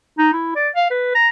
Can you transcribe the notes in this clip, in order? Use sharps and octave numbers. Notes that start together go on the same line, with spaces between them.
D#4
E4
D5
F5
B4
A#5